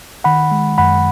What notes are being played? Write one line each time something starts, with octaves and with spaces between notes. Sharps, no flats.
D#3 F#5 B5
G#3
F#2 F#5 B5